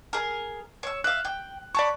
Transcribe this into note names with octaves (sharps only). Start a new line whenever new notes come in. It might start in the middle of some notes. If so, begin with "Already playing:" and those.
G#4 A#4
C#5 E6
E5 F5 F#6
G5
C#5 D5 A5 B5 C#6